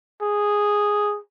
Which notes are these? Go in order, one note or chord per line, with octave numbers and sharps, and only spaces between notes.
G#4